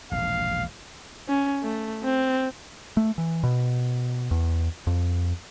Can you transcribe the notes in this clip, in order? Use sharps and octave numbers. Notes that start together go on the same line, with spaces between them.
E1 A#1 F5
C#4
A3
C4
A3
E3
B2
E2
F2